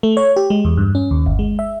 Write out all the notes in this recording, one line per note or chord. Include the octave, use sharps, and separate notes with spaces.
A3
C#5
G4
G#3
E2
G2
C#4
D#2
G1
G#3
E5